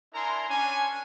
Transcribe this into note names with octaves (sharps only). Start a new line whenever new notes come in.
D4 E4 A#4 G#5 A#5 C6
C#4 D4 G#5